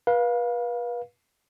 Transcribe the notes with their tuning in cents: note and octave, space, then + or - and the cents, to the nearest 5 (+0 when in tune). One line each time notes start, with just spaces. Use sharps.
B4 -35 F5 +10